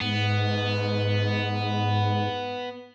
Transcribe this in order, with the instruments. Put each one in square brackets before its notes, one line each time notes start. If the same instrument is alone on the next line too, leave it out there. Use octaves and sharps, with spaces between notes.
[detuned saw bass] G#2 [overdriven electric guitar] B3